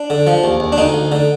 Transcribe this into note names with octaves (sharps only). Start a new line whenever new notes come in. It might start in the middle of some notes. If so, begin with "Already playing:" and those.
Already playing: D4
D3
F3
D#2
D#2
D4
D2 D#4
D2
D3